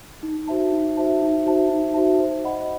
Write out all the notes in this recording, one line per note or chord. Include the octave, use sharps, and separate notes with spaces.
D#4
F#4 C5 E5 A5
D#4
F#4 C5 E5 A5
D#4
F#4 C5 E5 A5
D#4
F#4 C5 E5 A5
C5
D#5 F#5 B5